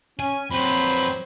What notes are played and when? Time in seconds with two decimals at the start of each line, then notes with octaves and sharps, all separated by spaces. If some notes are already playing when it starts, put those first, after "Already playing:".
0.19 C#4 G#5
0.50 F2 F#3 C4 G4 B4 C5 B5